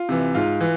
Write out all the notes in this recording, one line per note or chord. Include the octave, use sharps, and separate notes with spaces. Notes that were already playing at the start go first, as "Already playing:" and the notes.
Already playing: F4
C3 E3
G#2 F4
E3